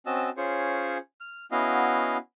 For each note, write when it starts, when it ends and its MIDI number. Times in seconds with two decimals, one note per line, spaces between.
0.06 0.30 60
0.06 0.30 61
0.06 0.30 66
0.06 0.30 75
0.06 0.30 81
0.06 0.30 88
0.37 0.98 61
0.37 0.98 65
0.37 0.98 68
0.37 0.98 72
0.37 0.98 73
1.21 1.45 89
1.52 2.17 59
1.52 2.17 61
1.52 2.17 64
1.52 2.17 66
1.52 2.17 75
1.52 2.17 77